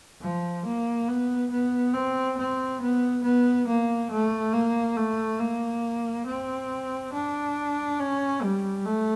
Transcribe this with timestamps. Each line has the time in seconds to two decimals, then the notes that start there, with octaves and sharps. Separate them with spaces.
0.21 F3
0.65 A#3
1.08 B3
1.51 B3
1.94 C4
2.38 C4
2.81 B3
3.23 B3
3.67 A#3
4.11 A3
4.53 A#3
4.96 A3
5.40 A#3
6.26 C4
7.13 D4
7.99 C#4
8.42 G3
8.85 A3